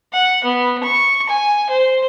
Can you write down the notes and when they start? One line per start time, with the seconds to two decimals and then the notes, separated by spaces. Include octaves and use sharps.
0.13 F#5
0.44 B3
0.83 C#6
1.29 G#5
1.70 C5